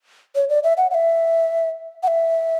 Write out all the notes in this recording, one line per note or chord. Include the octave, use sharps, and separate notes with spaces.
C#5
D5
E5
F#5
F#5
E5
F#5
E5